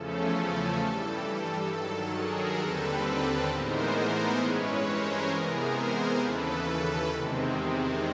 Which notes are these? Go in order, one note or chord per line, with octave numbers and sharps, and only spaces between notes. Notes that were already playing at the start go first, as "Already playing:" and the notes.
Already playing: E2 C#3 F3 A3 C#4 A4
G2 E3 G3 A4
A4
G2 D#3 F#3 A4
G#4 A#4
D#2 D3 G3 C4 A4 B4
A2 E3 G#3 B3 D#4 A#4 C5
G2 E3 G#3 C#4 B4 C#5
A#4 C5
C3 E3 G#3 B3 G#4 A#4
A#4 C5
A#4 C5
D#2 C#3 E3 A4 B4
E2 C3 D#3 G#3 C4